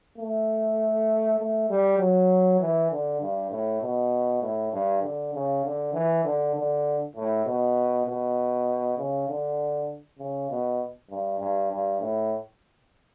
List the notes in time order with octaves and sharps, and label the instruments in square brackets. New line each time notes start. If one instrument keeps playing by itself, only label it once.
[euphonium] A3
A3
G3
F#3
E3
D3
G2
A2
B2
A2
G2
D3
C#3
D3
E3
D3
D3
A2
B2
B2
C#3
D3
C#3
B2
G2
G2
G2
A2